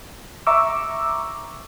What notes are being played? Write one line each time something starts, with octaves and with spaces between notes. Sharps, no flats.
E5 A#5 C#6 D6 E6